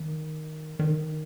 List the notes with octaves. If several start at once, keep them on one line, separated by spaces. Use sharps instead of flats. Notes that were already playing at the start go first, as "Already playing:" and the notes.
Already playing: D#3
D#3